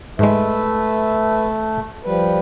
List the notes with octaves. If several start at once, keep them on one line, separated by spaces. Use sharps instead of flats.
G#2 G#3 A3 B4 E5
F3 G3 B4